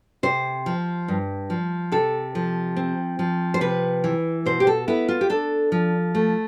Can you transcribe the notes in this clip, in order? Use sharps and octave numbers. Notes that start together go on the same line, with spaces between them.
C3 C5
F3
G2
F3
C3 A4
F3
C4
F3
C5
C3 B4
E3
B2 C5
G4
A4
B3 E4
F4
G4
D4 A4
F3
A3